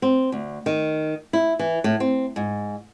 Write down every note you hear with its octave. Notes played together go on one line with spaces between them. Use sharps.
C4
D2
D#3
E4
E3
A2
C4
G#2